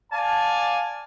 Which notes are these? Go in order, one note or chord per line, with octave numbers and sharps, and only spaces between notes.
D5 F5 G#5 A5